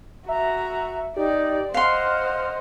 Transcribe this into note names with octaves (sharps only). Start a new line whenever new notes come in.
F#4 E5 A#5
D#4 G4 D5
C5 D#5 F5 F#5 C6 F6